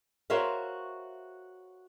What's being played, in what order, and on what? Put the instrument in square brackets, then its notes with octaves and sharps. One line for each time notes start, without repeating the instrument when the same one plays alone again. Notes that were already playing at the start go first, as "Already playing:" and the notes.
[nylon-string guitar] F#4 A#4 C5 C#5 E5 F5